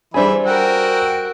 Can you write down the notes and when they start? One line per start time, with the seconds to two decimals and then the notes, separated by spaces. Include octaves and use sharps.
0.14 E3 G3 D4 G#4 C5 E5 G#5 B5
0.46 F#4 A#4 F#5 G5 E6